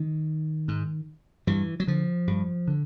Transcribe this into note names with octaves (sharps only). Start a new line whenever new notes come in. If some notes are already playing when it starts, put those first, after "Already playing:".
Already playing: D#3
G#2
G2 E3
F#3
D3 F3
G2
D3